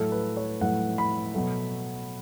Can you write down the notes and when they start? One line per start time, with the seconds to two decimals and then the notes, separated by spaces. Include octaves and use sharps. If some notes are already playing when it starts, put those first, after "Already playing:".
Already playing: A2 F#3 A3 A4
0.12 B4
0.37 C#5
0.61 A2 F#3 A3 F#5
0.98 B5
1.34 B2 F#3 A3